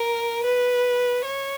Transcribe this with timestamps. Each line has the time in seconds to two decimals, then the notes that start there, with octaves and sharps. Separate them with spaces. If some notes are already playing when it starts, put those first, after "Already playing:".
Already playing: A#4
0.44 B4
1.25 C#5